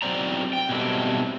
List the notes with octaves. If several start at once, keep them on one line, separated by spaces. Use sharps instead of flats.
F#3 C4 C5 D5 A#5
G5
B2 D3 F#3 G3 A3 C4